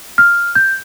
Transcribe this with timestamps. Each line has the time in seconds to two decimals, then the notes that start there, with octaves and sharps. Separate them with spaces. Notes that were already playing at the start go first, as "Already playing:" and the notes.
0.18 F6
0.55 G6